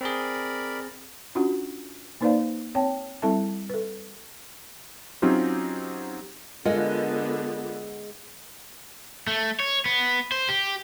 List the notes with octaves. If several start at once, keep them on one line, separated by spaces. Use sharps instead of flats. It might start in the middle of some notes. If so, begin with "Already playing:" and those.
C4 G#4 A#4 D5 B5
C#4 D4 F4 F#4 F#5
A#3 D#4 B4 C5 D5 F5
C4 C#5 G5 A5
G3 C4 E4 A4 E5 A5
A4 B4
F#3 C4 C#4 D#4 F4 G4
D3 G#3 B3 F4 A#4 D#5 F#5
A3
C#5
B3
C5
G4